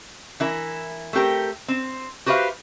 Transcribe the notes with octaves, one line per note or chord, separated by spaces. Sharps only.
E3 E4 A#4
A3 C4 G4 A#4
C4
F#4 G4 B4 C5 E5 F5